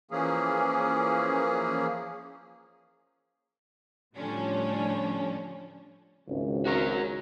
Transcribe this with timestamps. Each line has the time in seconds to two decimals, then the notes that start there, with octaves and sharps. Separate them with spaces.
0.11 E3 F3 A#3 C#4 G#4
4.16 A2 D3 F3 G3 C#4 D4
6.28 G#1 C#2
6.65 F#4 A#4 C#5